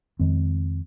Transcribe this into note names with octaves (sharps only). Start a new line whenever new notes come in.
F2 D#3 G#3 C4